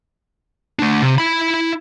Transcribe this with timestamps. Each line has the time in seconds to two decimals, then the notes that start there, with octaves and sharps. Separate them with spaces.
0.79 A3 D4
1.02 C3
1.18 E4 B5